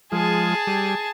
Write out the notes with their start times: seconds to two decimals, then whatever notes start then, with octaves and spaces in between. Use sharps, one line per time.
0.12 F3 G#3 G#4 A5
0.67 G3